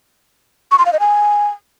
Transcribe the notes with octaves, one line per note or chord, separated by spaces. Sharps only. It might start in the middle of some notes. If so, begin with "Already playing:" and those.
C#6
C6
F5
D#5
G#5